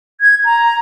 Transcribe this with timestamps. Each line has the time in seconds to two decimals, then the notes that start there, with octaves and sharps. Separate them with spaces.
0.21 G#6
0.45 A#5